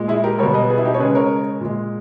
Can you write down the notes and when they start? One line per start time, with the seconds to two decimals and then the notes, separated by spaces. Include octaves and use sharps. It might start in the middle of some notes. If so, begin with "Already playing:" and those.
Already playing: A#2 G#3
0.08 E4 G#4
0.24 G4 A#4
0.39 G3 A#4 C#5
0.43 B2
0.54 B4 D#5
0.70 G#4 B4
0.78 E4
0.85 D#4 G4
0.94 C#5
1.00 C#3 G#3 G#4 B4
1.15 A#4 C#5
1.61 A#2 G#3